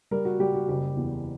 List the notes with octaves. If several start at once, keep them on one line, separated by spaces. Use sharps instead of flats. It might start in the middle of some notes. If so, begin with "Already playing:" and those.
G3 A#4
F#4
G3 G4
F#4
F#1 G4
E2